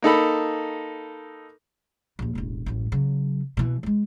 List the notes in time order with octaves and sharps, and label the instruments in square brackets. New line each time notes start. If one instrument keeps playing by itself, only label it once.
[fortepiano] A#3 D#4 A4 B5
[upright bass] A#1 D#2
E1 A1
A1 F#2
C#3 F#3
B2 E3
G3 G#3